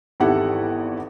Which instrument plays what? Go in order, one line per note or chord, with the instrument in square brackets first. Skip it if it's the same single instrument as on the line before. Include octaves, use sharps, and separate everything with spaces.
[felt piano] G#1 E2 E4 G4 A4 F#5